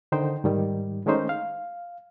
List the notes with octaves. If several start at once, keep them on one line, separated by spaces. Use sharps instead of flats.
D3 D#3 D#4 C5 G5
G#2 D#3 G3
D#3 G#3 A3 C#4 D#4 C5
F5